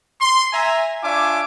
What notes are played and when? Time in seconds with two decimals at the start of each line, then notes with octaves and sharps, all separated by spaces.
0.21 C6
0.53 E5 G#5 A#5
1.04 D4 F4 C#5 E5 G#5 D6